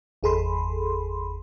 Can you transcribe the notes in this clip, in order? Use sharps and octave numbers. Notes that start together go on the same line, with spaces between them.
G1 E2 G#4 A4 B5 C6